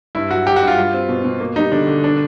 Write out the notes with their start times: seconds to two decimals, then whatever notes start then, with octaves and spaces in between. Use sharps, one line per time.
0.15 G2 E4
0.31 F#3 F#4
0.47 F#3 G4
0.56 F#4
0.62 G2
0.68 F4
0.78 G3
0.93 C4
1.09 B2
1.24 B2
1.40 A#3
1.56 G3 D#4
1.72 D3 D4
1.87 D3
2.04 D4